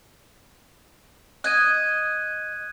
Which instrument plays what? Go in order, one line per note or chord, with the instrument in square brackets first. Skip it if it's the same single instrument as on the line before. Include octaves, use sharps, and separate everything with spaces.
[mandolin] D#5 [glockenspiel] F#6 G#6 D#7